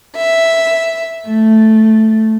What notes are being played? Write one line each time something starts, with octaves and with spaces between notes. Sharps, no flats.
E5
A3